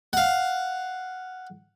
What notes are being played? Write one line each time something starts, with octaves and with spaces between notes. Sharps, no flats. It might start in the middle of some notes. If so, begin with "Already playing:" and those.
F5 F#5